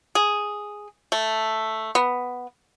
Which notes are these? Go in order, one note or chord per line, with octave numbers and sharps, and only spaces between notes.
G#4
A3
B3